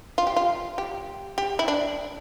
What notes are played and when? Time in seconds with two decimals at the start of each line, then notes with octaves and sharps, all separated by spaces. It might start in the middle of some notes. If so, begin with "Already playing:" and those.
0.18 F4
0.27 G4
0.36 F4
0.78 G4
1.38 G4
1.59 E4
1.68 D4